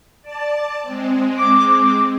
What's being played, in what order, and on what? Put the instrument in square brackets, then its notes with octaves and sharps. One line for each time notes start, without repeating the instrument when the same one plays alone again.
[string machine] D5 A5
G#3 C4
[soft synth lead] D6